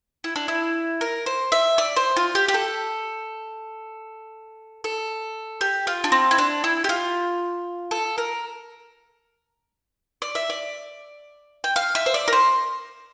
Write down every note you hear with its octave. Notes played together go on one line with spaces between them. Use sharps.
E4
D4
E4
A#4
C5
E5
D5
C5
F4
G4
G4
A4
A4
G4
F4
D4
C4
E4
D4
E4
G4
F4
A4
A#4
D5
E5
D5
G5
F5
E5
C5
D5
A#4
C5